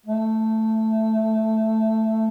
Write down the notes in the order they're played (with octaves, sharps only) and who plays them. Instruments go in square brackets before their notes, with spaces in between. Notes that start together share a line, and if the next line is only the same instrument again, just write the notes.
[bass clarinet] A3